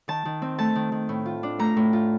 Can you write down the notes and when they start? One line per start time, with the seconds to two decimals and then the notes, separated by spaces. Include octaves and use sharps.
0.08 D#3 A5
0.25 D#3
0.42 C4
0.59 A3 A5
0.75 D#3
0.92 D#3
1.09 A2
1.26 F4
1.43 D4
1.59 A3 A#5
1.77 A2
1.93 F4